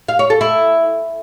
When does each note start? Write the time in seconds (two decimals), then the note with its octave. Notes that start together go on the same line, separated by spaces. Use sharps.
0.08 F5
0.19 C#5
0.30 A4
0.41 E4